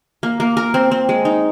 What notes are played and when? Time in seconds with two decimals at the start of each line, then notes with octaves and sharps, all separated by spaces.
0.23 A#3
0.40 A#3
0.57 A#4
0.74 C4
0.91 C4
1.09 G#3
1.25 D#4